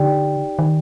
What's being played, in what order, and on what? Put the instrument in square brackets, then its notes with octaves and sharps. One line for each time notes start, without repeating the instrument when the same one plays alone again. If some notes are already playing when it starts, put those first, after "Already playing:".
Already playing: [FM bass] D3 [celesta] D#4 G4 D5 G5
[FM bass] D#3